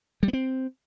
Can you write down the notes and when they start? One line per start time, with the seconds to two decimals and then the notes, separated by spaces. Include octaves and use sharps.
0.23 G3
0.28 B3
0.33 C4